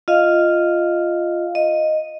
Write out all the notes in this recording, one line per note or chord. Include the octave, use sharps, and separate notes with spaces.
F4 D#5 F5
D#5